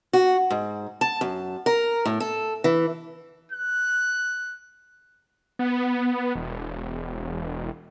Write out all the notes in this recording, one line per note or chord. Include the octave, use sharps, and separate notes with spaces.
F#4
G#2
A5
F#2
A#4
A2
A4
E3
F#6
B3
E1